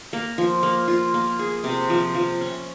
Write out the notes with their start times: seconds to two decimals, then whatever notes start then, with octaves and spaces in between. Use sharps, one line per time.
0.13 A#3
0.38 F3
0.63 A#3
0.88 F4
1.14 A#3
1.39 G#4
1.64 C3
1.90 F3
2.15 F3
2.41 C#4